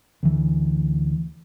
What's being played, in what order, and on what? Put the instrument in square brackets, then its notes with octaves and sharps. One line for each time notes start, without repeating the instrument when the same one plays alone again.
[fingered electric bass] D2 E3